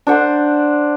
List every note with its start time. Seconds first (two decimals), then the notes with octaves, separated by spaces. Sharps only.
0.07 D4 C5 F#5